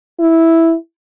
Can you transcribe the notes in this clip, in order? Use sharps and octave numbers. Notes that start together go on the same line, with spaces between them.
E4